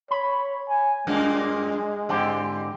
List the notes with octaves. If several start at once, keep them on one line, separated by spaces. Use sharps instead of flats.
C#5 B5
G#5
F#2 A#2 G#3 A#3
G#2 D3 E3 C4 G4